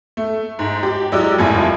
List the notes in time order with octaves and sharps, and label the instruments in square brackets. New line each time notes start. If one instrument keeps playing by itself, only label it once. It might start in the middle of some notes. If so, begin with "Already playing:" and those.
[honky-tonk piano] A3
G#2
G4
F#3 G#3 E4 G4 D5
F#1 F2 A2 F4 G#5